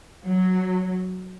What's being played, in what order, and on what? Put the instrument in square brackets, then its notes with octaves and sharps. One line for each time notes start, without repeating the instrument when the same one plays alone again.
[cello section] F#3